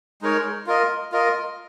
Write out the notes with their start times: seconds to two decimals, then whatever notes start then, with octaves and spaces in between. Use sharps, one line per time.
0.22 G#3 D#4 A#4 C#5
0.66 F4 A#4 D#5
1.12 F4 A#4 D#5